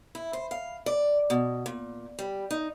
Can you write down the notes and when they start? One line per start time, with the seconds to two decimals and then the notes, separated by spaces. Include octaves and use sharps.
0.15 E4
0.33 C5
0.51 F5
0.86 D5
1.30 B2
1.66 A#2
2.19 G3
2.51 D#4